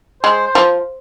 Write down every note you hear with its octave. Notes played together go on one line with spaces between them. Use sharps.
G#3 C5
C5
F3